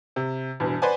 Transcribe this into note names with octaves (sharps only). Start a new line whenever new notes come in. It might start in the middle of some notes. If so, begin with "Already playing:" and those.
C3
E1 E2 G2
B4 C5 D5 F#5 G#5